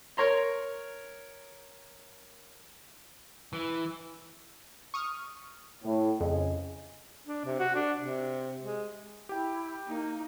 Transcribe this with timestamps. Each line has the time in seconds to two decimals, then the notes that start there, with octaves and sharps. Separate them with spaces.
0.17 A#4 C#5 A#5 C6
3.53 E3
4.94 C#6 D#6 F6
5.84 A2
6.21 F2 C#3 G#4 D#5
7.27 D4
7.45 C3
7.60 F#4
7.75 D4
7.99 C3
8.62 G#3
9.29 E4 G4 G5
9.87 A#3 D#4